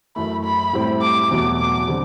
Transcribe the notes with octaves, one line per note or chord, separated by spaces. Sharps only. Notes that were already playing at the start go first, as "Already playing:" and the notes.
F#2 E3 A3 B5
B5
A2 G3 C4 E4
D6
E2 B2 F#3 A3
D6
D3 G3 C4